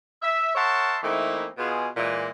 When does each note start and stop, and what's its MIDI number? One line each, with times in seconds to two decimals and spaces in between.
0.22 0.52 76
0.55 0.98 70
0.55 0.98 73
0.55 0.98 76
0.55 0.98 78
0.55 0.98 81
0.55 0.98 84
1.03 1.47 52
1.03 1.47 57
1.03 1.47 58
1.03 1.47 60
1.03 1.47 63
1.03 1.47 64
1.58 1.88 47
1.58 1.88 65
1.58 1.88 68
1.97 2.29 46
1.97 2.29 52
1.97 2.29 56